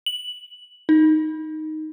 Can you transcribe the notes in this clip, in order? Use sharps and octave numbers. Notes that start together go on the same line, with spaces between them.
F#7
D#4